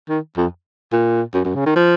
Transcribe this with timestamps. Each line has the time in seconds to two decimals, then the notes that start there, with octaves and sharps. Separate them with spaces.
0.09 D#3
0.37 F2
0.92 A#2
1.34 F#2
1.45 F#2
1.55 C#3
1.66 D#3
1.76 F3